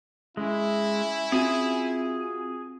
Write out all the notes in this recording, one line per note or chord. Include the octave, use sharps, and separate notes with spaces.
G#3 C#4 E4
C4 F4 F#4 G#4 G#5